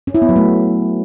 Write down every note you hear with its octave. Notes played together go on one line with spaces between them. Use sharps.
C#4
E4
B3
F#3
A3